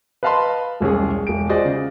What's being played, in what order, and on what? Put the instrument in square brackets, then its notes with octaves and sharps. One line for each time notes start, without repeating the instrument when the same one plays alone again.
[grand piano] B4 D#5 F5 A5 B5 C6
E1 C2 C#4 G#4
E1 D7
F4 F#4 G#4 C5 D5 D#5
C#3